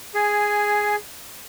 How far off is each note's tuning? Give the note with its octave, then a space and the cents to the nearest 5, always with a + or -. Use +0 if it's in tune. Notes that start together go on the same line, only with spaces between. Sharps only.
G#4 +0 G#5 +10